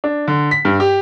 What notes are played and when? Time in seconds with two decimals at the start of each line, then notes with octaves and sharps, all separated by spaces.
0.04 D4
0.28 D3
0.51 B6
0.65 G2
0.80 G4